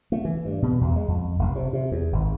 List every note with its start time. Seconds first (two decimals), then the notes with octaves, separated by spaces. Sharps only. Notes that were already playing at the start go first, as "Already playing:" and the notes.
0.12 A3
0.25 E3
0.45 G2
0.62 B2
0.81 E2
0.96 G#3
1.08 F2
1.39 F1
1.55 C3
1.73 C3
1.91 E2
2.12 G#1